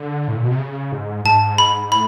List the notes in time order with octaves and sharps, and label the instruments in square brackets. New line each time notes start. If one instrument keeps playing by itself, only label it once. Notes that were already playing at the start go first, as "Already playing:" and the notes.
Already playing: [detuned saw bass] D3
A2
A#2
B2
C3
C#3
G#2
[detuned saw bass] G#2 [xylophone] A5
[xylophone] B5
[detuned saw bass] A2 [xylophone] B5